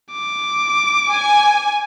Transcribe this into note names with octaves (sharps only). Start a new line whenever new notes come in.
D6
G#5